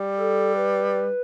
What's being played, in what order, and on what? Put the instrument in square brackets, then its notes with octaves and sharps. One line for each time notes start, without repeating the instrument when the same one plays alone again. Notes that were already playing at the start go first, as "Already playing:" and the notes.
Already playing: [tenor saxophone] G3
[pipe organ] A4
B4